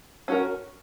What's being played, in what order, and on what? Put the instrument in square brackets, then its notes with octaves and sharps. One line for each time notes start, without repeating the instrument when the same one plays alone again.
[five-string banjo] C#4 F#4 A#4